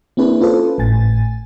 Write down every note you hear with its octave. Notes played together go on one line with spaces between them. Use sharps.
A#3 C4 D4 E4 G#4 B4
C#4 F4 A4 B4 C5
G#1 A2 G#5 A6